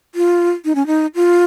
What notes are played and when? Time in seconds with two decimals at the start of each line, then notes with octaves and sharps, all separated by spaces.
0.15 F4
0.65 D#4
0.75 C#4
0.87 D#4
1.15 F4